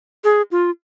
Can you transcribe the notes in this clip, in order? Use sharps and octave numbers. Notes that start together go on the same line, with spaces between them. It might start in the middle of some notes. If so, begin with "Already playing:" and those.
G#4
F4